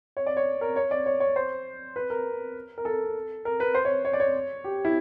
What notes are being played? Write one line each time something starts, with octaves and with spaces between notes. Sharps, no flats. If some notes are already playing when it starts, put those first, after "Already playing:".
C#5
D5
C#5
A#4
C#5
D5
C#5
C#5
C5
B4
A#4
A#4
A4
A#4
B4
C5
C#5
C#5
D5
C#5
G4
E4